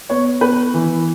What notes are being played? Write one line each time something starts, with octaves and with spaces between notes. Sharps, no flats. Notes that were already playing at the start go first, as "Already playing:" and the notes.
B3 C#5
B3 B4
E3